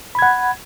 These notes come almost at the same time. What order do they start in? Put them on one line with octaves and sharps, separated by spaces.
B5 G#6 F#5